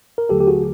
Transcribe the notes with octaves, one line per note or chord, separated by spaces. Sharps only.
A#4
D#2 D3 F#3 A3 G4 A4
G4
F#4 G#4